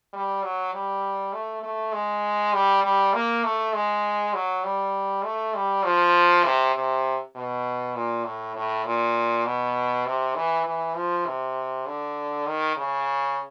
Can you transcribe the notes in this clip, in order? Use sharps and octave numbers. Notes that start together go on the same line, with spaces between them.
G3
F#3
G3
A3
A3
G#3
G3
G3
A#3
A3
G#3
F#3
G3
A3
G3
F3
C3
C3
B2
A#2
A2
A2
A#2
B2
C3
E3
E3
F3
C3
D3
D#3
C#3